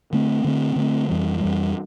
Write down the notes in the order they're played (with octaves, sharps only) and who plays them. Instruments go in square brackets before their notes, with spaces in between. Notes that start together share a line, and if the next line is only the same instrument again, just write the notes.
[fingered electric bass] D3 A3 C4
D3 A3 C4
D3 A3 C4
F2 E3 G3
F2 E3 G3